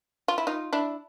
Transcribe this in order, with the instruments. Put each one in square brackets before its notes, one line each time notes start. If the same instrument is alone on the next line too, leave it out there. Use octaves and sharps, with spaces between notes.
[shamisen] F4
E4
D#4 F4
D4 E4